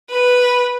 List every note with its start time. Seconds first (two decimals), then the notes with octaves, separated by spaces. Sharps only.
0.10 B4